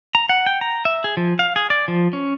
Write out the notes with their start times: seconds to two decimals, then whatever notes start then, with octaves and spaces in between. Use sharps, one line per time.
0.15 A#5
0.29 F#5
0.46 G5
0.61 A#5
0.85 E5
1.04 G#4
1.17 F3
1.39 F5
1.56 G#4
1.70 D5
1.88 F3
2.13 C#4